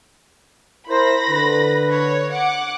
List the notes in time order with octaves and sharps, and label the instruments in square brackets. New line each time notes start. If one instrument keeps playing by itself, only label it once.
[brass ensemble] E4 A#4 C5 [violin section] B5 A#6
[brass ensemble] D3 B4
[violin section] C#5
F#5 D6